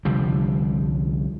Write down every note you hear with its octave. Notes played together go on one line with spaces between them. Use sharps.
C2 D3 F3 G3